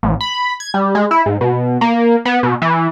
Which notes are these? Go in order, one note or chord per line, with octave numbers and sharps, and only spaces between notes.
A1
B5
G#6
G3
G#3
E4
G#2
B2
A#3
B3
B2
E3